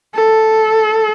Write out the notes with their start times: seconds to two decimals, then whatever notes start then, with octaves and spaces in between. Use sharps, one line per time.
0.15 A4